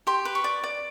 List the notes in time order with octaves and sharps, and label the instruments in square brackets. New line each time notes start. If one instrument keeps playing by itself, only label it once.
[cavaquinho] G4 C6
B4
C#6
D5
D5